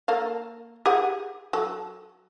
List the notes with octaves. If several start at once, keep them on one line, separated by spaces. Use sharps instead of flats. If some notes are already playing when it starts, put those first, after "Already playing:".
A#3 A4 F5
G4 G#4 F#5
F#3 A4